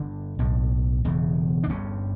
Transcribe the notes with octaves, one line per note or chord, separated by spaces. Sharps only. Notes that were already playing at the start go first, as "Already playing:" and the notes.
Already playing: G1 G2 D3 D4
B1 A2
E1 E2 C#3
D4
G1 G2 D3 C#4